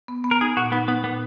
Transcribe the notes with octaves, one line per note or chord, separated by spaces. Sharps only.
B3
B3
A#4
D#4 G#4
A#2 F#4
B3 D#4
B3 D#4
A#2 B3